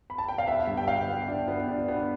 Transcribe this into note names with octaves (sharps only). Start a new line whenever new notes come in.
B5
A5
G5
F5
B3 E5
G2
G5
B3 F5
B3
D4
B3
D4
B3